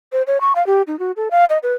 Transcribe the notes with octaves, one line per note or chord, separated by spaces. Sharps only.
C5
C#5
C#6
F5
G4
D#4
F#4
A4
F5
D#5
B4